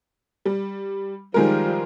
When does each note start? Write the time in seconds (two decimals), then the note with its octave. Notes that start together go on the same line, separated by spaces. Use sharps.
0.46 G3
1.34 D#3 F3 G3 G#3 A#4